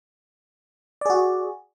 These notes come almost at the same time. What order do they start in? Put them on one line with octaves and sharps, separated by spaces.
D5 G#4 F#4